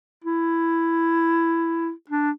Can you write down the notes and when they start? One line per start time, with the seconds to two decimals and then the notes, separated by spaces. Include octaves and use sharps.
0.24 E4
2.10 D4